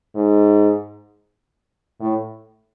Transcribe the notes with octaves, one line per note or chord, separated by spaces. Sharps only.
G#2
A2